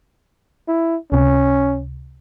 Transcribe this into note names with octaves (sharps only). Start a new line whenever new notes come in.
E4
C#2 C3 C#4